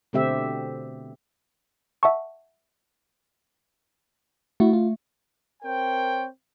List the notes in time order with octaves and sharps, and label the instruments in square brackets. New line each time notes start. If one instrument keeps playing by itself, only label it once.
[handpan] B2 D3 A3 C4 G4 E5
[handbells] E5 F#5 A5 C#6
[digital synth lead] A3 [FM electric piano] E4 F#4
[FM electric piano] F4
[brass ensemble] C4 A#4 C5 C#5 G5